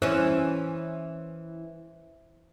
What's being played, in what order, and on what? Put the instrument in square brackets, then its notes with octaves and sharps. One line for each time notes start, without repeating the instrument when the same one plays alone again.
[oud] E3 C#4 [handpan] C5